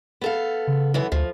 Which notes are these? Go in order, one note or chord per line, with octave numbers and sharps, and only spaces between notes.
B3 A4 F5
C#3
F#2 E3 B3
D2 F3